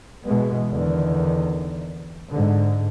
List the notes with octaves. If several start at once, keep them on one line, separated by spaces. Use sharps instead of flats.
B2 E3 G#3 B3
E2 D3 D#3
G#2 D3